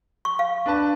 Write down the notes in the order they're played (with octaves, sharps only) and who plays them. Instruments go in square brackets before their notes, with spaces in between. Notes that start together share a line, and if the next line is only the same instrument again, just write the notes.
[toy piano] C#6
F5
[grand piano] D4 B4 A5